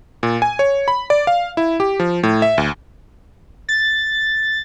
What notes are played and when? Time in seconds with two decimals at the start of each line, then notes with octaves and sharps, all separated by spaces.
0.23 A#2
0.42 G#5
0.59 C#5
0.88 B5
1.10 D5
1.27 F5
1.57 E4
1.80 G4
2.00 F3
2.23 A2
2.42 E5
2.58 D2
3.69 A6